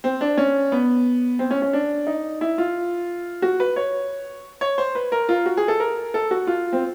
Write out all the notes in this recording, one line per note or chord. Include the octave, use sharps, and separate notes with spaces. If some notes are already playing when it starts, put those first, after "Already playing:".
C4
D4
C#4
B3
C4
C#4
C#4
D4
D#4
E4
F4
F#4
B4
C#5
C#5
C5
B4
A#4
F4
F#4
G#4
A4
A#4
A4
F#4
F4
C4